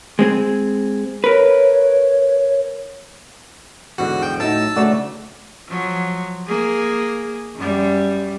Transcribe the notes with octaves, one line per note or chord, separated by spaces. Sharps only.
G#3 C4 G#4
A#4 B4 C#5
E2 G#2 D3 F#4
F3 G5
A2 F#3 A3 D#4 E5 A5 E6
D2 C#3 F#3 A3 F#4 D5
F3 F#3
A#3 G#4
F#2 G3